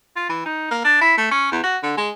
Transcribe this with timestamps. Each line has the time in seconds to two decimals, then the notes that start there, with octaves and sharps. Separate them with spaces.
0.16 F4
0.29 E3
0.46 D#4
0.71 A#3
0.84 D4
1.01 E4
1.17 A3
1.31 C#4
1.51 E2
1.64 F#4
1.83 D3
1.97 G#3